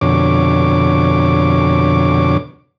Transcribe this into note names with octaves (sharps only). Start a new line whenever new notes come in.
F2 B2 D3 C#5 D6